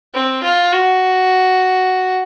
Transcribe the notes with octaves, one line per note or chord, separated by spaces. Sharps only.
C4
F4
F#4